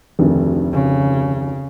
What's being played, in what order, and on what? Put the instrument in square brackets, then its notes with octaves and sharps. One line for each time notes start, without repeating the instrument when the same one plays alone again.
[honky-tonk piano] F1 D2 D#3
[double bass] C#3